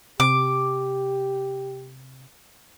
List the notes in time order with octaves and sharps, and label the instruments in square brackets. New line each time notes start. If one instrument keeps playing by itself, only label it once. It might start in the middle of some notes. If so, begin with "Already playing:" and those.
[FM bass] C3 [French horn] G4 [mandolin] D6